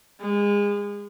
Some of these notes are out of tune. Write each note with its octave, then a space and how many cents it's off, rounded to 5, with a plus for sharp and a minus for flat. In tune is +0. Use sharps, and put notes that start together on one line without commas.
G#3 -30